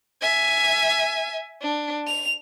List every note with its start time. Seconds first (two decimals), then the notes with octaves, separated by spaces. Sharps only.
0.22 E5 G#5
1.62 D4
2.07 F7